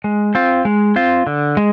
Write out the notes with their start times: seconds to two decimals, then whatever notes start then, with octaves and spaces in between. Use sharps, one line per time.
0.04 G#3
0.35 C4 F4
0.65 G#3
0.96 C4 F4
1.27 D3
1.57 G#3